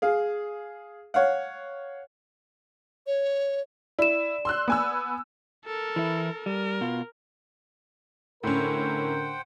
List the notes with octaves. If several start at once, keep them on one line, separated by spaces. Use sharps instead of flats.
G#4 F5
C#5 F5 F#5
C#5
E4 D5 E7
C6 E6 F#6
B3 G#5 E6
A4 A#4
E3 E4
G3 A#4
B2 F4
A2 D3 C#4 A#4 C5 F#5 G5